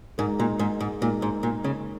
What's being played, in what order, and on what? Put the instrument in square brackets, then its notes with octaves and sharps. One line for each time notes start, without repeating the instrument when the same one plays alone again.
[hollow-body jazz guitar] G#2 [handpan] G#3 D#4 A#4
[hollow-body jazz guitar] A#2
G#2
G#2
[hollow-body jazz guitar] A#2 [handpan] G#3 D#4 A#4
[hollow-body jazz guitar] G#2
A#2
C#3